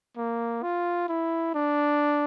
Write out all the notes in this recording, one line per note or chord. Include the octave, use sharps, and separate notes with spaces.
A#3
F4
E4
D4